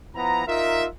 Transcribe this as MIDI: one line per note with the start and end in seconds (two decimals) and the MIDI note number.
0.15 0.43 53
0.15 0.43 59
0.15 0.43 64
0.15 0.43 82
0.47 0.86 63
0.47 0.86 65
0.47 0.86 70
0.47 0.86 76